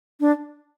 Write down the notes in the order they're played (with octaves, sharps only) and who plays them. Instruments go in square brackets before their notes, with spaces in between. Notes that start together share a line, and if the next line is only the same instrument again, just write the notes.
[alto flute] D4